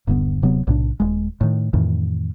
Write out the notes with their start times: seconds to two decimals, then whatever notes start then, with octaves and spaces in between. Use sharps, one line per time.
0.07 D#1 G2 D3 B3
0.42 D1 C3 F#3 B3
0.67 B1 A2 C3 D4
1.00 D#1 G#3
1.41 A2 D#3
1.73 F2 A2 D#3 E3